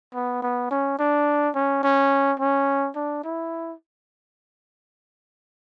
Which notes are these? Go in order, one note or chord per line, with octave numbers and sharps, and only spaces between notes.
B3
B3
C#4
D4
C#4
C#4
C#4
D4
E4